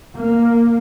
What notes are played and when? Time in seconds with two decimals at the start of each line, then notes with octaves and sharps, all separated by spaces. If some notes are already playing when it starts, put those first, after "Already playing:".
0.17 A#3